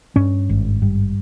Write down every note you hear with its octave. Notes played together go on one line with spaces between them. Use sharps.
G2 C#4
G#1
G2